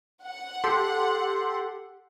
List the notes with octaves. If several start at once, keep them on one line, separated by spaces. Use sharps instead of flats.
F#5
G4 A4 C6